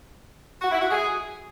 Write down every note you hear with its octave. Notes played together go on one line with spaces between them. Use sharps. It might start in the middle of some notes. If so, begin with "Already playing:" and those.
F#4
E4
F#4
G#4